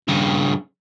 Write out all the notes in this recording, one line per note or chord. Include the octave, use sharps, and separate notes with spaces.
G2 C#3